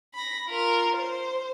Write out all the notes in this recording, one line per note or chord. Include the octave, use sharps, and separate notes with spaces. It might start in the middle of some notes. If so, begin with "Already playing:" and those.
B5 A#6
F4 A#4
C5